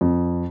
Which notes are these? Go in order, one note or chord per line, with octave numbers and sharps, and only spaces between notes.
F2